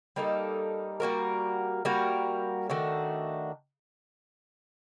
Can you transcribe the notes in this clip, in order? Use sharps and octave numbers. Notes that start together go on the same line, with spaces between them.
G3 A#3 D#4 A4
G3 A#3 F#4 A#4
G3 A#3 F#4 A#4
D#3 A3 D4 F#4